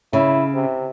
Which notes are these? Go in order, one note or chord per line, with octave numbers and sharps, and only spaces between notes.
C#3 E4
C3